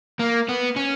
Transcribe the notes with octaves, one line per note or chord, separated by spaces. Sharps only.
A#3
B3
C#4